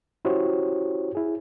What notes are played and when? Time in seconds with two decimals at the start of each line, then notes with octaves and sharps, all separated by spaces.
0.25 C#4 E4 F#4 G4 C5 C#5
1.15 E4 G#4